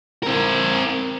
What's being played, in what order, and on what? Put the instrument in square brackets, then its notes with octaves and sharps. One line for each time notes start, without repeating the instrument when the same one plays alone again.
[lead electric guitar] C4 A#4